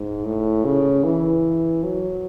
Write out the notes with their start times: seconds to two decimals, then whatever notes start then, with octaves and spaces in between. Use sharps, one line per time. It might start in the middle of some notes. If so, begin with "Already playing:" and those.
Already playing: G#2
0.24 A2
0.65 C#3
1.04 E3
1.84 F#3